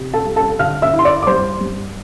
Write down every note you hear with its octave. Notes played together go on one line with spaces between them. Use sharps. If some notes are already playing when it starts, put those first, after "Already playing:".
Already playing: C3
A4 A5
G3
A4 A5
D3 F5 F6
E5 E6
E4
C6
D5 D6
D6
G2 C5 C6
G2